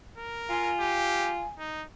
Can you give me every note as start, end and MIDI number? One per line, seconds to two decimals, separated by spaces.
0.17 0.73 70
0.50 1.42 65
0.50 1.50 80
0.80 1.32 67
1.59 1.84 63